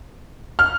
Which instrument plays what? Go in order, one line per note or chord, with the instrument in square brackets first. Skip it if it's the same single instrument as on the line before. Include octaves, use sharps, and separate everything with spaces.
[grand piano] F6